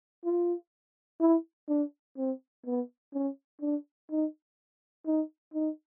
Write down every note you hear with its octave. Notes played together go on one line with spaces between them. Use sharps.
F4
E4
D4
C4
B3
C#4
D4
D#4
D#4
D#4